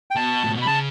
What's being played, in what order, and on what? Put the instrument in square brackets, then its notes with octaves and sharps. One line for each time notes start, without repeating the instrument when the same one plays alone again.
[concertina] G5
[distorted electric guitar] B2 [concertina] A5
[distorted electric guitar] A2
B2
[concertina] B5
[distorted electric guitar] C#3 [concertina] A5